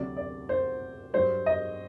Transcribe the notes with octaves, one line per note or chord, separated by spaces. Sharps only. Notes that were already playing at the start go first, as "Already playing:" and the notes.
Already playing: D2 C3 F#3 D5
D5
C5
G2 F#3 C5
D#5